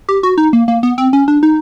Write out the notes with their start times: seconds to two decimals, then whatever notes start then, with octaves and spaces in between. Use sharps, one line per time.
0.09 G4
0.23 F#4
0.38 D#4
0.53 A#3
0.68 A#3
0.83 B3
0.98 C4
1.13 C#4
1.28 D4
1.43 D#4